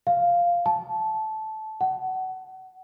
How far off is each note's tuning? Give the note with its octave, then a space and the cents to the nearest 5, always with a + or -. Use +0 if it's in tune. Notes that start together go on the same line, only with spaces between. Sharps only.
F5 -5
A5 -15
F#5 +25